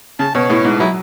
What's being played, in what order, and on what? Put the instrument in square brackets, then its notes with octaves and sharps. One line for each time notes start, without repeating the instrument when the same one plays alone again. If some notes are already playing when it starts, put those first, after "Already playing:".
[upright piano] C#3 [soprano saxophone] A5
[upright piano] B2 [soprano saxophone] C#5
[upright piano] A2
G#2
[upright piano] F#3 [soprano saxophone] E4